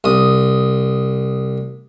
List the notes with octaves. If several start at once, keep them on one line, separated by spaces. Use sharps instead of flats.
C2 D#6